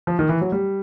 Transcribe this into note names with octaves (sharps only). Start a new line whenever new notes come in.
F3
D#3
E3
F#3
G3